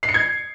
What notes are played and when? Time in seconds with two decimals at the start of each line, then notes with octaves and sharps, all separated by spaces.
0.03 C7
0.09 C#7
0.14 G#6